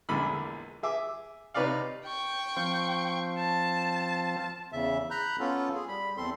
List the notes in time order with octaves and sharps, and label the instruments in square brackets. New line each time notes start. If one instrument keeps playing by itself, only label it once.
[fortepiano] A#1 E2 D3 G#3 B5 E6
G#4 E5 D6
C3 D#4 B4 C#5 D5 F5
[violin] G5 C#6
[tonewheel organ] F3 C4
[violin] A5
[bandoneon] E2 C#3 E5
A#5 B5 F#6 G6
B3 C#4 F4 A4
G#4
G3 B5
E2 C4 A4 C6